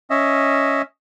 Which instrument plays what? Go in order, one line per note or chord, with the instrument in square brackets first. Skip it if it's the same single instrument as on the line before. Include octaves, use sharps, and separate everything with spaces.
[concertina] C#4 D#5 E5